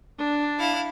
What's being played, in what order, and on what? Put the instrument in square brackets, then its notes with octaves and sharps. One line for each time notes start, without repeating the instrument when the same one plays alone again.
[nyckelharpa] D4
[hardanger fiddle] E4 F5